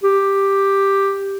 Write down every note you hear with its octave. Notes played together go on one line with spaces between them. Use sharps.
G4